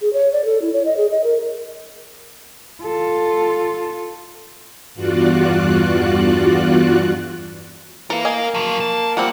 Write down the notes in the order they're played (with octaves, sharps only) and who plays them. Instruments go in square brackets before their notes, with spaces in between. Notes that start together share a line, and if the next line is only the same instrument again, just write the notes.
[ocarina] G#4
C#5
D5
A4
E4
C#5
D#5
G#4
D#5
A#4
[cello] F4 A4
[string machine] E2 G2 F4 F#4 D5 F#6
[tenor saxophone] E3 [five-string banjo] A4 [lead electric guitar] A#4 F5
[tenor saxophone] A#3 [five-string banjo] D#5 G#5
[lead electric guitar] F3 F#3
A5
[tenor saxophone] F3 [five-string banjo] G3 A#3 C4 [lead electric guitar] F#5